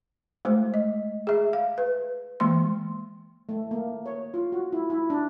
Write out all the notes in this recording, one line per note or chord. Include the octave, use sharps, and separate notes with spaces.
G#3 A3 C5
D#5
G#4 E5
F5
B4
E3 G#3 A#3 C6
A3
A#3
C#5
F4
F#4
E4
E4
D4